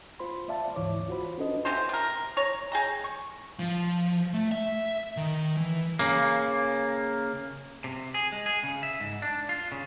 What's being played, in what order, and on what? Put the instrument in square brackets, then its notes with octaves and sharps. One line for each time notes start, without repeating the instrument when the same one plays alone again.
[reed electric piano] F4 C5 B5 C6
D5 E5 F5 A5
D2 G#2 E3 E4 C#5 D6
F4 F#4 C5 B5
C#4 D4 A4 B4 C5 D#5
[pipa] C3 E3 F#4 C5
C3 A#4
C#5 A#5
G#4 G5 A#5
C#6
[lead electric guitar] F3
A3
E5
D#3
E3
[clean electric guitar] C#3 A#3
C3
G#4
G#3
G#4
C#3
E5
G#2
D4
F4
C#3